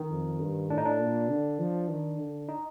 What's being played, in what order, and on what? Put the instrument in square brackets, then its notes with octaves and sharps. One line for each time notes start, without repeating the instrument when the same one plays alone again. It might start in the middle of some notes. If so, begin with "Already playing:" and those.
Already playing: [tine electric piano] D#3
[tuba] F2
G2
[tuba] A2 [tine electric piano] D4
[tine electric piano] D#4
D4
[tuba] A#2
D3
F3
D#3
D3
[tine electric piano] D#4